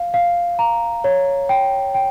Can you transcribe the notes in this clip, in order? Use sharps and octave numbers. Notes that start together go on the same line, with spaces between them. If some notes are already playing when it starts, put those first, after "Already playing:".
Already playing: F5
F5
A#5
C#5
G5
G5